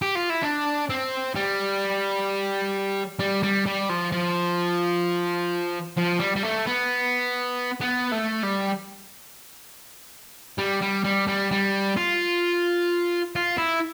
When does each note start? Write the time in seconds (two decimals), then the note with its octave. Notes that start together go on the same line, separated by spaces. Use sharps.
0.02 G4
0.15 F4
0.30 E4
0.43 D4
0.90 C4
1.36 G3
3.19 G3
3.43 G3
3.66 G3
3.89 F3
4.12 F3
5.97 F3
6.20 G3
6.36 G3
6.43 A3
6.66 B3
7.81 B3
8.12 A3
8.43 G3
10.58 G3
10.82 G3
11.05 G3
11.28 G3
11.51 G3
11.97 F4
13.36 F4
13.58 E4